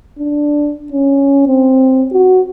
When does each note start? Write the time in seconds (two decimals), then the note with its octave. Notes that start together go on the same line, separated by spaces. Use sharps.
0.19 D4
0.92 C#4
1.47 C4
2.12 F#4